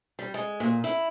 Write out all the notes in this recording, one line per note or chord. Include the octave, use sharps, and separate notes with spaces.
G3
G#3
A#2
E4